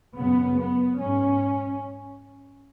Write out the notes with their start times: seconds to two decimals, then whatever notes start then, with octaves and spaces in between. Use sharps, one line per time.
0.18 F#2 C#3 B3
0.60 B3
1.01 G#2 C#4